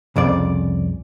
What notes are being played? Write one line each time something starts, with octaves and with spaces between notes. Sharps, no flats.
C2 F2 C#3 D5